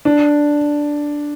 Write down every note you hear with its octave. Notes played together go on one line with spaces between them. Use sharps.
D4